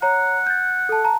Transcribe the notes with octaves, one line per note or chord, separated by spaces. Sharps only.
C#5 F#5 A#5
G6 A6
A4 A5
A5 A#5